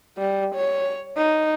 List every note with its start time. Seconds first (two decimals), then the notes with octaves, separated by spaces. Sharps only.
0.18 G3
0.55 C#5
1.17 D#4